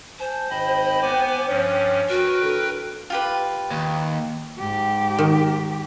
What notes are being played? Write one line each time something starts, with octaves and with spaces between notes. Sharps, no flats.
C5 G#5 A5
G#1 D#5 G5 B5
B3 G#5 D6
G2 F3 C#4 C#5
F#4 A#4 B4 G5
A2 D3 A4
F4 G4 B4
D#2
G#2 G4
D#3